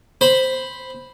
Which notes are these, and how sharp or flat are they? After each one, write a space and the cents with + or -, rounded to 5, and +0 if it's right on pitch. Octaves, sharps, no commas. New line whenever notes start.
C5 +0 B5 +0